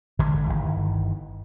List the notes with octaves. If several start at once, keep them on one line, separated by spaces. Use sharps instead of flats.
G#1 D3 E3 G#3
G1 C#2 D#3 E3